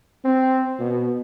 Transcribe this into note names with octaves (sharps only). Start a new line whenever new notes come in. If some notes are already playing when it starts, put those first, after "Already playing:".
C4
B2